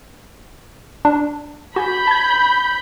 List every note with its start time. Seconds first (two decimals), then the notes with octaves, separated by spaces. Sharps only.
1.05 D4
1.76 F#4 G#5 B5 G6
2.07 A5 G#6